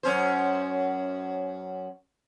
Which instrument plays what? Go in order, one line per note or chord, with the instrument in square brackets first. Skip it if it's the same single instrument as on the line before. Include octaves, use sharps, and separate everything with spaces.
[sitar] F#2 C#4 C5